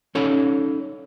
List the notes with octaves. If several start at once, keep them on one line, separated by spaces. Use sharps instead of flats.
C#4 D#4 A4 C#5 B5